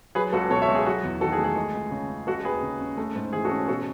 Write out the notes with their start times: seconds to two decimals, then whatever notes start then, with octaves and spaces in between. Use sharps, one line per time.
0.15 F#3 G#4 B4
0.33 C#2 F#4 A4
0.50 B2 A4 C#5
0.62 C#5 E5
0.68 C#2
0.75 G#4
0.85 F#3 F#4
1.03 E2
1.21 D#3 F#4 A4
1.32 G#4
1.38 A3
1.44 G#4
1.56 G#3
1.74 C#2
1.91 C#3
2.09 C#4
2.27 G#3 F#4 A4
2.45 D#2 G#4 B4
2.62 C#3
2.81 C#4
2.97 A3
3.16 G#2
3.33 E3 G#4
3.45 F#4 A4
3.51 C#4
3.68 B2 F#4 A4